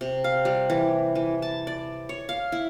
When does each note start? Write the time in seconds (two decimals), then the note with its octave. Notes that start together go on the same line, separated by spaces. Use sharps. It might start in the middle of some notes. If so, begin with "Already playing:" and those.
0.01 C3
0.24 F5
0.45 G3
0.70 E3
1.15 E3
1.42 A5
1.67 D5
2.09 C#5
2.29 F5
2.52 E4